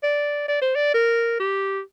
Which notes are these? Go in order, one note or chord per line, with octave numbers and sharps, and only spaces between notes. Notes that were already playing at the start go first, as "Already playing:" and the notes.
D5
D5
C5
D5
A#4
G4